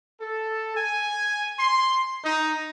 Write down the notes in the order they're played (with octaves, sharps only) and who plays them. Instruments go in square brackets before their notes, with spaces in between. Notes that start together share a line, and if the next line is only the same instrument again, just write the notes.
[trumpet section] A4
G#5
C6
D#4